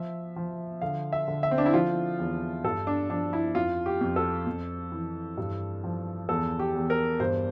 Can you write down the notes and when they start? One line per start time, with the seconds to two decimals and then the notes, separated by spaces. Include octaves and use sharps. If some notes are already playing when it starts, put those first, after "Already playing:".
Already playing: F3 E5
0.36 F3
0.82 D3 F5
1.12 E5
1.28 D3
1.43 E5
1.51 C4
1.58 D4
1.66 E4
1.73 F3 F4
2.19 E2
2.65 G2 A4
2.87 D4
3.10 F3 D4
3.33 E4
3.55 F2 F4
3.86 G4
4.01 F2
4.16 A4
4.47 F2
4.92 E3
5.38 G2
5.84 F3
6.29 E2 A4
6.59 G4
6.75 E2
6.90 A#4
7.20 G2 C5